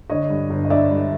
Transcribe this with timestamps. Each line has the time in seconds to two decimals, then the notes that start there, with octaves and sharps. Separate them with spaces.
0.10 D3 C#5 D#5
0.30 G2
0.50 G1
0.65 D#5
0.70 D3 D5 E5
0.90 G2